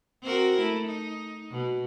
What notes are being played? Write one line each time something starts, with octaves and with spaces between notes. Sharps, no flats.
C4 F#4 A#4
A3 E4
D#4
B2